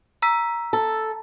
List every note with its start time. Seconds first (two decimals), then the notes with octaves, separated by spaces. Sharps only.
0.22 A#5 E6 B6
0.73 A4